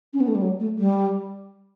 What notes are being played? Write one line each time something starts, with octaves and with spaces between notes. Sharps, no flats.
C#4
B3
A3
G3
F#3
A3
G3